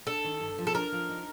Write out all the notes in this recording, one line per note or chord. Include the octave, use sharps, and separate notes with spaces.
D4 A4
D#3
G2
F3
A4
D4 A#4
F3
D#4